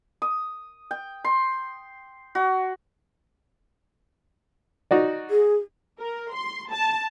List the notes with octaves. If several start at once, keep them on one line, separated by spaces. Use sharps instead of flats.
D#6
G5
C6
F#4
D#4 F#4 D5
G#4
A#4
C6
A5